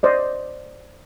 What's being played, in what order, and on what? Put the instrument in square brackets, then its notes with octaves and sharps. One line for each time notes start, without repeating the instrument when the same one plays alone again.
[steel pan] C5 D5 D#5